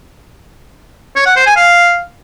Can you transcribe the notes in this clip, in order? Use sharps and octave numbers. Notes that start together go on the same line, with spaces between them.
C#5
F#5
C5
G#5
F5